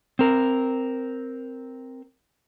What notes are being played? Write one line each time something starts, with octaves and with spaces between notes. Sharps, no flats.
C4 A#4